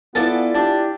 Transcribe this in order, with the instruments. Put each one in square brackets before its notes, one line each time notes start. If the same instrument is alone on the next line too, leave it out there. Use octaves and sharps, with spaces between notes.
[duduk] B3 [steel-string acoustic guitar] E4 D5 G#5 [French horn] F4 [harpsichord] A4
[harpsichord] D4 [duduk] G4